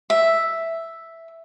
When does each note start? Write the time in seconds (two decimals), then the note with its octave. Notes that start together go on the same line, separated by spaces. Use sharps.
0.10 E5